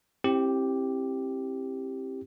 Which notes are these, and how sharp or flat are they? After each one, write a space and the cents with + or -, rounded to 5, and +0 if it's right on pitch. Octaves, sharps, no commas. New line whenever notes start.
C4 +30 E4 +0 G4 +0